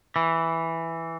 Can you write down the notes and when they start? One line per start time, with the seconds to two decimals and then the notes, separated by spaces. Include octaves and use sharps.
0.16 E3